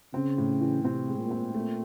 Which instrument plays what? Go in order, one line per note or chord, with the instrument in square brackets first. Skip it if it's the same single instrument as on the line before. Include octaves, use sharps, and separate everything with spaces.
[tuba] C#3 [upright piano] C4
[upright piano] A2
E3
[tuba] C3 [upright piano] C4
[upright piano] G#3
[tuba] A#2
[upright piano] C4
[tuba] A#2 [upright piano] A3